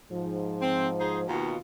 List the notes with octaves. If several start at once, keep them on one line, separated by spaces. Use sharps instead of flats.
G#2 F3
C4
D#4 G#4 C5
D#2 B2 F4 F#4